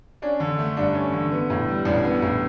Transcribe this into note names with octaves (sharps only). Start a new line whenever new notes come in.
C#4 D4
D3
A3
G2 D4
C#4
D3
B3
A2
G3
A1 D4
B3
A2